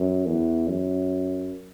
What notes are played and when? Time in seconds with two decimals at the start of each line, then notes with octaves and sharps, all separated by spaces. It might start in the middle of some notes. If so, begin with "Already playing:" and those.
Already playing: F#2
0.26 E2
0.68 F#2